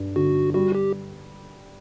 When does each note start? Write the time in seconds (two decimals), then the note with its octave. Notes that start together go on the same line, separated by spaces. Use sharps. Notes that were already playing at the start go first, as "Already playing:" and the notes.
Already playing: G2 D4
0.16 D3 F#4
0.54 G3 F#4
0.75 G4